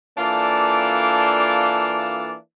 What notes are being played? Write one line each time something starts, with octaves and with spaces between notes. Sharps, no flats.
E3 A#3 D4 F4 A4 D5